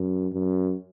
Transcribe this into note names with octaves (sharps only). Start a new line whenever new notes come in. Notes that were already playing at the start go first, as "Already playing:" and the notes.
Already playing: F#2
F#2